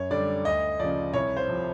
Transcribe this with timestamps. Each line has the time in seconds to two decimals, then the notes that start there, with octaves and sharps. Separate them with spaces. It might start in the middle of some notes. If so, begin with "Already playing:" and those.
Already playing: F#2 C#5
0.11 D3 G3 D5
0.45 D2 D#5
0.80 C#3 F3 D5
1.13 C2 C#5
1.37 C5
1.48 C3 F3